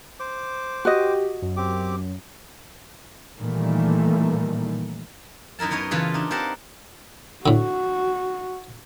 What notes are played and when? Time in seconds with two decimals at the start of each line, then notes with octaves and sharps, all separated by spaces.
0.20 C5 D6
0.85 F#4 G4 D#5
1.42 F#2
1.57 C4 G4 D6
3.39 A#2 D#3 E3 G3 A3 A#3
5.59 F#2 D#4 E4 A#4 A5
5.71 B3 D#4 A#4 C#5 D#5
5.91 C#3 E3 F4 A4 B4
6.14 D4 D#4
6.31 C4 G4 A#4 C5 F#5 A5
7.46 A2 D3 F#4